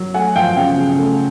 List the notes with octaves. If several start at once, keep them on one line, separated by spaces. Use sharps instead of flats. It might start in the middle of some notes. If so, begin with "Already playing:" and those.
Already playing: F#3
A3 F#5 G#5
F3 F5 G5
C#3 F5 G5
C#3
A3